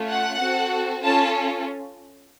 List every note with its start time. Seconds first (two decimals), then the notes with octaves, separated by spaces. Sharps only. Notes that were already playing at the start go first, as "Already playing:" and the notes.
Already playing: A3 C#4 F4
0.10 F#5
0.40 C4 F#4 A4
1.03 C#4 F4 A4 A5